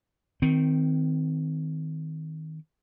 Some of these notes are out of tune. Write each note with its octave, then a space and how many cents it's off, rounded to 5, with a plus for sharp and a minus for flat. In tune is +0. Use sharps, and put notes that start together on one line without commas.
D#3 +15 C4 -25